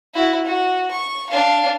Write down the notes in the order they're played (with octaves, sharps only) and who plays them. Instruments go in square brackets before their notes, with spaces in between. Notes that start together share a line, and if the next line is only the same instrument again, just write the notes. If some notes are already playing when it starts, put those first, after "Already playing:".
[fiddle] E4 F#4
F#4
C#6
D4 F5